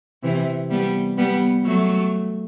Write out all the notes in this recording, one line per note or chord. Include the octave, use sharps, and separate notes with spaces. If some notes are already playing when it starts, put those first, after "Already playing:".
C3 E3
G3 B3
G3 B3
F#3 A3